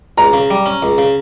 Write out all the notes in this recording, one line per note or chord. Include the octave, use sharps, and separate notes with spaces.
C#2 A#5
C#3
G3
C#4
C#2
C#3